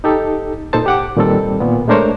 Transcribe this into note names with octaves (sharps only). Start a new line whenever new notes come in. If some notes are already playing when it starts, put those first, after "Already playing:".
D#4 G4 A4
A#2 D#4 A4 C5 A5
G4 F#5 D6
A#2 D#3 G3 C4 A4
A#2 B3
G#3 A3 D4 A#4 C5 C#5